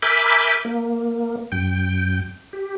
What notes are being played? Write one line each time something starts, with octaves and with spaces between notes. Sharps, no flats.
A#4 E5 G#5 B5 D6 G6
A#3
F#2 G5
G4